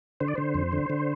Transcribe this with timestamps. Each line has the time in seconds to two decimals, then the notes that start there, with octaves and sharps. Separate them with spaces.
0.20 D3 C5
0.28 D5
0.35 D3 C5
0.54 F2
0.72 D3
0.90 D3